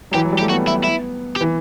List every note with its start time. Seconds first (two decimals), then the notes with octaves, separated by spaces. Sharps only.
0.11 F#3
0.15 E3 G4
0.24 F#3
0.32 G3
0.39 A3 G4
0.49 B3 F#4
0.67 E4
0.84 E4
1.36 G4
1.41 E3